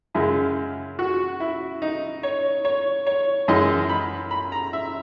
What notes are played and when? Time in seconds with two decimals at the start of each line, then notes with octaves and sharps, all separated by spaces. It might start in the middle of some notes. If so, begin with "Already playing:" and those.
0.14 F#2 C#3 G#3 E4
0.99 F#4
1.40 E4
1.82 D#4
2.23 C#5
2.65 C#5
3.07 C#5
3.48 F#2 E3 G#3 D#5
3.89 B5
4.31 B5
4.52 A#5
4.73 E5